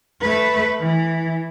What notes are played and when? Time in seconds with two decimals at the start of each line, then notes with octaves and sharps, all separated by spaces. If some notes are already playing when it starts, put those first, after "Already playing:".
0.21 A3 B4
0.80 E3